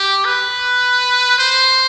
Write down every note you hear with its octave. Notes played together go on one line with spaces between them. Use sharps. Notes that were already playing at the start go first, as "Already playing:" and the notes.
Already playing: G4
B4
C5